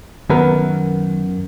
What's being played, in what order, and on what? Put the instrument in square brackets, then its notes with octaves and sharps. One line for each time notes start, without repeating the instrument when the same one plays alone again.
[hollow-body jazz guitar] F#2 B3 A#4 [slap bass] D#3